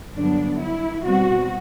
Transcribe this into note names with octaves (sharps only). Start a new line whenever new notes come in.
G2 D3 F#3 B3 D4
E4
B2 G3 C4 F#4